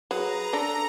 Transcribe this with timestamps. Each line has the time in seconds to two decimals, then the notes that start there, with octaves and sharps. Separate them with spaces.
0.11 F#3 G#4 B4 A#5 B5
0.53 D4 A4